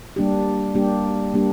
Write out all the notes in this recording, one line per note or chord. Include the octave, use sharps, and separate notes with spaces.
G3 A#3 D4 G4
G3 A#3 D4 G4
G3 A#3 D4 G4